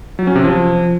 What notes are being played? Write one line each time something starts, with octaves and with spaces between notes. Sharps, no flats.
F#3
C#4
C3
F3